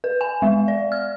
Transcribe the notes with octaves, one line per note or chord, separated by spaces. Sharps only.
B4
G#5
G#3
D5
F6